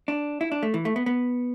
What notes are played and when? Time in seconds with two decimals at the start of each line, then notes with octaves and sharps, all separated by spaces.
0.08 D4
0.41 E4
0.52 D4
0.63 A3
0.74 E3
0.85 A3
0.96 B3
1.06 B3